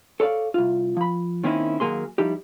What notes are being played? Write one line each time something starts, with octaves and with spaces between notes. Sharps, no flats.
A4 C#5 D5 F5
C2 F4
F3 B5
D#3 A#3 C4 C#4 D#4 E4
D#2 F#3 A#3 G#4 C6
F3 G3 D#4 E4 G4